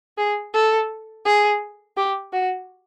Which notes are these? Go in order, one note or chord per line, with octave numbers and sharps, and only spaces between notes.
G#4
A4
G#4
G4
F#4